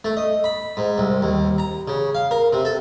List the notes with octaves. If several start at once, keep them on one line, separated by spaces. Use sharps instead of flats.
A3
D#5
B5
G#2
C2
D#2
A#5
C#3
F5
A#4
C3
A4